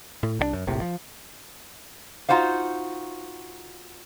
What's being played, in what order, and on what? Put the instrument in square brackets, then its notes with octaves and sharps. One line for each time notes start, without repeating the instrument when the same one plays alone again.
[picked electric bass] A2
C2 F3 D4
F#2
F1 A#1 A2 C3
F3
[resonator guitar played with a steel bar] D#4 F4 F#4 C5 F5